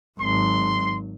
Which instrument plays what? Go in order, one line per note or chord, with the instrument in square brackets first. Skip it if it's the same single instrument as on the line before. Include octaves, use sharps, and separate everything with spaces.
[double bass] G#1 F#3 [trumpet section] C6